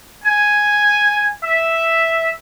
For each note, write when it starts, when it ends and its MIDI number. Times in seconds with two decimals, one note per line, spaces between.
0.24 1.29 80
1.44 2.30 76